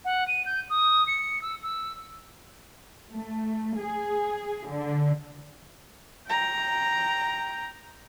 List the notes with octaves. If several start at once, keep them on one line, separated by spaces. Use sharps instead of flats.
F#5
D#7
G6
D#6
C#7
E6
E6
A3
G#4
D3
G5 A#5